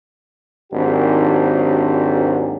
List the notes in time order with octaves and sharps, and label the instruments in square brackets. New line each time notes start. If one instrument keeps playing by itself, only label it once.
[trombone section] G#1 D#2 G#2 F#3 D4 G4